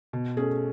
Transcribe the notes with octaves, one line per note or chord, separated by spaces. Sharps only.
B2
A3 C#4 G#4